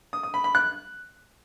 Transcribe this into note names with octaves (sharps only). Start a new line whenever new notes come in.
D#6
D#6
B5
B5
F#6